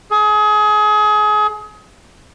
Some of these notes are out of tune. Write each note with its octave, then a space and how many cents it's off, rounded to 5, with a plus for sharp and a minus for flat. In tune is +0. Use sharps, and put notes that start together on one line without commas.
G#4 +30